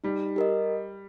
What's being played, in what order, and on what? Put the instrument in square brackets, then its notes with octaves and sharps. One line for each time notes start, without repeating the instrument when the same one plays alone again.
[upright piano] G3 [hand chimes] D#4
[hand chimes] G4 A#4 D#5